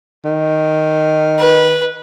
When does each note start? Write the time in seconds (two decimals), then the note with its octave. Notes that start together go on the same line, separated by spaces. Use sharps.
0.25 D#3
1.39 B4